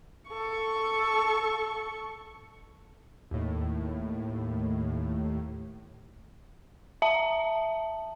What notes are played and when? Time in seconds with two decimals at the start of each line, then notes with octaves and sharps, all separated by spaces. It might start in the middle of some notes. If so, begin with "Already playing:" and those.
0.29 A4 C#6
3.31 D#2 A2
7.02 E5 A5